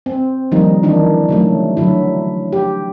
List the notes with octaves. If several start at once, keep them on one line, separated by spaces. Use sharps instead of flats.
C4
D#3 F3 G3 A#3 D#4
D#3 E3 D4 D#4
C#3 F#3 A3
D3 F#3 E4
G4